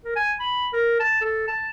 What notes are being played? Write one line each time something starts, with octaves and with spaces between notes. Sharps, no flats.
A#4
G#5
B5
A#4
A5
A4
A5